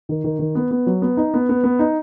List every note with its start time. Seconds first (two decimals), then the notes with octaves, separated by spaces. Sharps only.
0.09 D#3
0.24 D#3
0.39 D#3
0.55 B3
0.71 B3
0.87 F#3
1.02 B3
1.17 D#4
1.34 B3
1.49 B3
1.64 B3
1.79 D#4